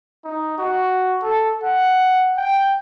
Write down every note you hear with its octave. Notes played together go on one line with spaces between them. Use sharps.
D#4
F#4
A4
F#5
G5